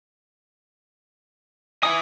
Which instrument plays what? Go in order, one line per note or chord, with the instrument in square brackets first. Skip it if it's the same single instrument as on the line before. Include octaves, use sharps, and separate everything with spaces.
[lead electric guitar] E4 G#5 [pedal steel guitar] D#6